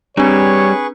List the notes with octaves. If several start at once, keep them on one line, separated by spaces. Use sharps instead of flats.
G3 C4 D4 G#4 B4 C#5 C#6